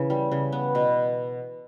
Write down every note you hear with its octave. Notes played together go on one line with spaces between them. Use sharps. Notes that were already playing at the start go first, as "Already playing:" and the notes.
Already playing: C#3 E3
G3
C#3
B3
B2